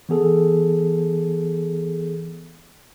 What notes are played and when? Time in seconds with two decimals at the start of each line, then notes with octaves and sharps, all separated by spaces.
0.09 E3 B3 G#4 A4